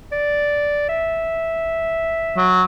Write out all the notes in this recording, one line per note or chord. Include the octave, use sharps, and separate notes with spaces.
D5
E5
F#3